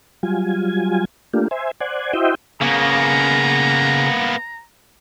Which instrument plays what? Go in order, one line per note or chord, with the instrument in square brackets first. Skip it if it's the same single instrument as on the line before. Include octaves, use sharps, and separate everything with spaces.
[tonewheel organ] F#3 G3 F4 G#5
A3 A#3 D4 F4 G4
C5 E5 G#5
C5 D5 F#5 G#5
E4 F#4 C5 D#5 E5 G5
[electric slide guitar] C#3 [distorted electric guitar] A#3 B3 [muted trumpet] A#5